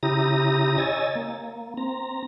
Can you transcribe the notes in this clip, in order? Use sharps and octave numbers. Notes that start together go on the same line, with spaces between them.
C#3 E4 G4 A#5 D#6 A#6
C#5 D#5 G#5 E6 A6
A#3
C4 A#5